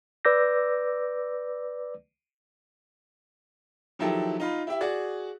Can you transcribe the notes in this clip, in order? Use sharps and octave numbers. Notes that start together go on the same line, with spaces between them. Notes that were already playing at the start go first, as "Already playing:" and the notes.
B4 D5 D6 E6 G6 A#6
D#3 F3 F#3 E4 G4 A4
D#4 F4 B5
E4 G4 E5
F#4 G#4 D5